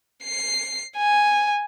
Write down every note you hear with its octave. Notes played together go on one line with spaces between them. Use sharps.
C7
G#5